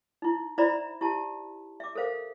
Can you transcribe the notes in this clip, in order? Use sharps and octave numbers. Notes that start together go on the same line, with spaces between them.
D#4 E4
E4 C5 D5 E5 A#5 B5
E4 G4 A5
E5 D6
A4 A#4 C5 F5